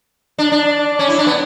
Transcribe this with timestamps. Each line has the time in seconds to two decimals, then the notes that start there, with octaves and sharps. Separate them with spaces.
0.38 D4
0.52 D4
0.99 C#4
1.08 E4
1.18 D4
1.27 B3